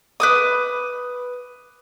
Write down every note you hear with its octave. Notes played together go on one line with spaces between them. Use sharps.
B4 D6 D#6